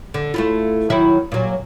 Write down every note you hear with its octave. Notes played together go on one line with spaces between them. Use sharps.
D3
A3 E4 F4
D#3 F#3 E4
A#2 F#3